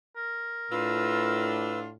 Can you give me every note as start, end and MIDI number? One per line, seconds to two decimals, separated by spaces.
0.17 1.64 70
0.71 1.97 45
0.71 1.90 62
0.71 1.90 65
0.71 1.79 71
0.71 1.79 88